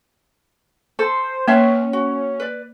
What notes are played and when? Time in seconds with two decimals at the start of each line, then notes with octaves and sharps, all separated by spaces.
0.99 A4 C5
1.48 A#3 C#4 B4 C5 E5
1.93 F#4
2.40 B4 D5